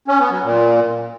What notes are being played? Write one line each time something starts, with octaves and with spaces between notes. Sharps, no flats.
C#4
B3
F#3
A#2